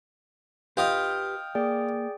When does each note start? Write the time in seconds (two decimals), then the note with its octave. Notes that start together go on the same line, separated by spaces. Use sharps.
0.77 F4 G4 B4 D#5 F5 G5 G6
1.55 A#3 G#4 D5 G5